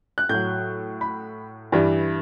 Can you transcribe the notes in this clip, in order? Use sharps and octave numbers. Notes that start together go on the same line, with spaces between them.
F#6
A2 F#3 G6
B5
G2 E3 G3